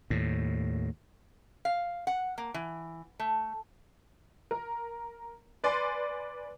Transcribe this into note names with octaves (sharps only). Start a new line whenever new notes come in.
D#2 A2
F5
F#5
A#3
E3
A3
A#4
B4 D5 G#5 C6